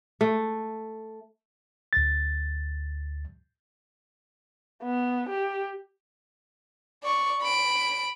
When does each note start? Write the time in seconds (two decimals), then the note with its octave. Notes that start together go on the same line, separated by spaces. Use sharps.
0.21 A3
1.93 D2 A6
4.83 B3
5.29 G4
7.04 D5 C#6
7.42 B5 D7